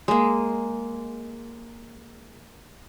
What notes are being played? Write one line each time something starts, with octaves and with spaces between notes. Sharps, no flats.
G#3 A#3